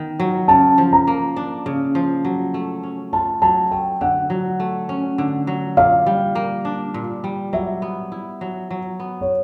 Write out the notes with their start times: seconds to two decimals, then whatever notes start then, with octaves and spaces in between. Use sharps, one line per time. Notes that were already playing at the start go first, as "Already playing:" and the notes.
Already playing: D#3 B3
0.20 F#3
0.48 C#3 A5
0.78 F3
0.93 A#5
1.07 A#3
1.36 D4
1.66 C#3
1.95 F3
2.25 F#3
2.54 A3
2.83 C#4
3.13 F4 A5
3.42 F#3 A5
3.71 A3 G5
4.01 D3 F#5
4.30 F#3
4.60 A3
4.89 C#4
5.18 D3
5.47 F#3
5.77 A#2 F5
6.06 G3
6.35 A#3
6.65 D4
6.94 A#2
7.24 G3
7.53 F#3 E5
7.82 B3
8.12 E4
8.41 F#3
8.71 F#3
9.00 B3
9.21 C#5